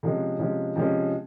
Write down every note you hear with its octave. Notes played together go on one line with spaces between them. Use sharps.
C3 F3 G#3 C#4
C3 F3 G#3 C#4
C3 F3 G#3 C#4